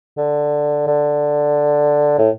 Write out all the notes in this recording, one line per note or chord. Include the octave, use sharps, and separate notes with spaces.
D3
D3
A2